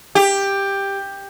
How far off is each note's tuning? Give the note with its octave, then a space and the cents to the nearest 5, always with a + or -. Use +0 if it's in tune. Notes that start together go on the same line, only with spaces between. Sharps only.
G4 +10